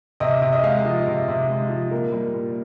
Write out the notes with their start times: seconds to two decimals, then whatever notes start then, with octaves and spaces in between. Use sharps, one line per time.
0.20 C3 D#5
0.42 C3
0.52 D#5
0.63 G#3 F5
0.85 F3
1.07 C3
1.28 C3
1.50 G#3
1.70 F3
1.91 A#2 A#4
2.12 G3
2.34 A#2